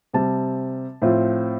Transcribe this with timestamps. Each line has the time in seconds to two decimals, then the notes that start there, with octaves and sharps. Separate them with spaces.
0.14 C3 G3 C4 A5
1.02 A2 F3 C4 F4